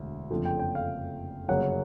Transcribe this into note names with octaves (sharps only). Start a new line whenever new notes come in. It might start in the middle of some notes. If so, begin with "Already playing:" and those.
Already playing: E1 D2
F#1 F2 D3 F3 A3
G5
G5
F5
G1 F#2 C#3 F#3 A#3 F#5